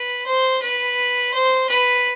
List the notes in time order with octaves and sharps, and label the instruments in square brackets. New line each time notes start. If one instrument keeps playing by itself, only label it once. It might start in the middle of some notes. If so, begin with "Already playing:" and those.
Already playing: [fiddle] B4
C5
B4
C5
B4